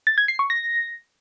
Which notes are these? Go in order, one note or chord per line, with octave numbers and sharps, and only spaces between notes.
A6
G#6
C7
C#6
A#6